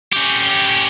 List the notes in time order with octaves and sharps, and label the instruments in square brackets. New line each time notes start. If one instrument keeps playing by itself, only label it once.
[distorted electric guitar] C#4 G4